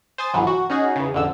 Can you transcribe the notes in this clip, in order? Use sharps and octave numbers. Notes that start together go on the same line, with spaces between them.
C5 G#5 D#6 A6
G1 C2 E3 F#3
F#4
C#4 D#4 F#4 G#4
E2 C#3
A1 F2 D3 E6